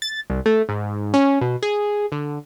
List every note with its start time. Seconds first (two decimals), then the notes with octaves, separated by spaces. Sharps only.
0.02 A6
0.30 C2
0.46 A3
0.69 G#2
1.14 C#4
1.41 B2
1.63 G#4
2.12 D3